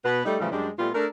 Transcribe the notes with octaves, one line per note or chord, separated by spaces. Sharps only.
B2 B3 B4
G3 A3 D#4
A2 C#3 E3 F3 G3 A3
F#2 G3 G#3 D4
A#2 G3 A3 B3 F4
A3 D4 A4 A#4